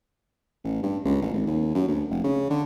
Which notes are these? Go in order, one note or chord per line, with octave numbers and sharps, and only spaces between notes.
A1
G2
C#2
A1
G#1
D#2
F#2
D2
F1
C#3
D3